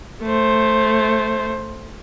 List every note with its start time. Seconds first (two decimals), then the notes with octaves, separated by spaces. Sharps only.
0.22 A3 C5